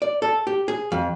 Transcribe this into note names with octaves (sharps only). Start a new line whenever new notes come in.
D5
A4
G4
G#4
F2